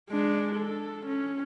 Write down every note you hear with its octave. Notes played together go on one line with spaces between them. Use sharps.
G#3 D4
A4
C#4